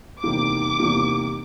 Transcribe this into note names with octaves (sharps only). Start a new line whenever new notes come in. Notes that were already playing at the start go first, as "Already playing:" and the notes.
E2 C3 D#3 G3 A#3 D6
E2 C3 D#3 G3 A#3